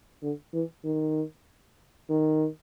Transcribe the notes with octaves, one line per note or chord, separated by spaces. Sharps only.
D3
E3
D#3
D#3